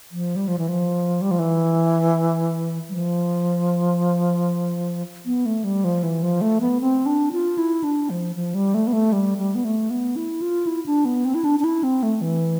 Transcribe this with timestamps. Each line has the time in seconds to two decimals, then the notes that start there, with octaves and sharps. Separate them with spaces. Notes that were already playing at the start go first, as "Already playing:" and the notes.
0.11 F3
0.36 G3
0.48 F3
0.58 E3
0.69 F3
1.22 G3
1.31 F3
1.39 E3
2.89 G3
2.94 F3
5.26 B3
5.46 A3
5.64 G3
5.84 F3
6.03 E3
6.23 F3
6.41 A3
6.61 B3
6.81 C4
7.06 D4
7.32 F4
7.58 E4
7.83 D4
8.10 F3
8.36 F3
8.55 G3
8.74 A3
8.87 B3
8.93 A3
9.13 G3
9.38 G3
9.55 B3
9.65 A3
9.90 B3
10.16 E4
10.42 F4
10.67 E4
10.86 D4
11.05 B3
11.25 C4
11.35 E4
11.44 D4
11.59 D4
11.64 E4
11.83 C4
12.03 A3
12.21 E3